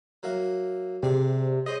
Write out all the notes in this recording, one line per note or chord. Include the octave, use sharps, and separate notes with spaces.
F#3 A#3 E5
C3 D4 G#4
G#4 C5 C#5 D#5